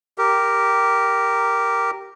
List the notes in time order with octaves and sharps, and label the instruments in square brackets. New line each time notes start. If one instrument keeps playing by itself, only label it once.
[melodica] G4 A#4